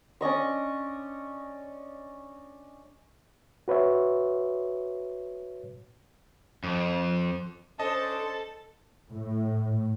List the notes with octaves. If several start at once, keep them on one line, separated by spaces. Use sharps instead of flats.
C#4 D4 D#5 C#6
F#4 B4 C#5 E5
F2
C#4 D4 A4 C5 D#5 A5
A2